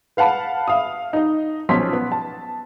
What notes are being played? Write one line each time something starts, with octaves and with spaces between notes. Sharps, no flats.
B4 F5 F#5 A5 B5
E5 F5 D#6
D#4 D#5
B1 F3 C#4 F4 C6 B6
B3
A5